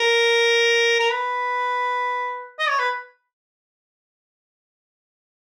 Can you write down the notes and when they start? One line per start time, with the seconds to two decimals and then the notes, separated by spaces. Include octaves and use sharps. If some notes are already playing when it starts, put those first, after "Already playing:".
Already playing: A#4
0.99 A#4
1.10 B4
2.59 D#5
2.69 C#5
2.79 B4